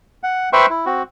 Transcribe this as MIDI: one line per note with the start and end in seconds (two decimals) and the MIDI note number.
0.23 0.49 78
0.53 0.66 71
0.53 0.66 72
0.53 0.66 76
0.53 0.66 79
0.53 0.66 84
0.53 0.66 85
0.70 0.85 64
0.86 1.03 60
0.86 1.03 66